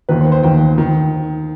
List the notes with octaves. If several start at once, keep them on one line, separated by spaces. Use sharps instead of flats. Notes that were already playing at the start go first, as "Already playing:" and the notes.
D#2 D#3 B4
C5
C5
D#2 D#3 G5
D#3